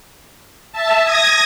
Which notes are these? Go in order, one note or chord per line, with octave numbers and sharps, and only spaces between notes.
E5 A5
D#6 G#6 A#6